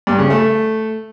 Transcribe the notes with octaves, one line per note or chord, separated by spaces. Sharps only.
G2
C#3
A3